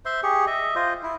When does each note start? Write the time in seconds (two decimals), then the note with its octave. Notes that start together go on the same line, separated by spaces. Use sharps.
0.05 C5 E5 C6
0.23 G4 G#4 C#6
0.47 D#5 E5
0.76 F4 C5 D#5
1.03 E4